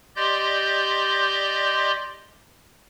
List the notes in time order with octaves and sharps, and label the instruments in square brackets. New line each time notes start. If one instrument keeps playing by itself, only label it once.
[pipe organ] G4 D5 D#5 C6 G6